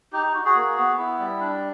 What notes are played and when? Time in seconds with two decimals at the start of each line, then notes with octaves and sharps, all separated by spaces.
0.13 D#4 G4
0.34 F#4
0.45 F#4 G#4
0.55 A#3
0.76 B3
0.98 E4
1.19 G3
1.40 D4